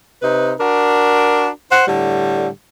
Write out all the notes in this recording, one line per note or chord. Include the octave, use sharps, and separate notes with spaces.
C3 D#4 B4
D4 F#4 A#4
C5 F#5
A2 D3 G3